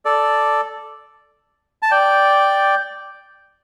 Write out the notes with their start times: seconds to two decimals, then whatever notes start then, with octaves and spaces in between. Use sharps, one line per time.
0.05 A4 D5
1.82 A5
1.91 D5 G5